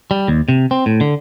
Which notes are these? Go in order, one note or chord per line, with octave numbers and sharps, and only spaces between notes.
G3
D#2
C3
C4
A2
D3